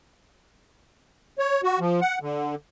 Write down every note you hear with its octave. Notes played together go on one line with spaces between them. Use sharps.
C#5
F#4
F3
F#5
D3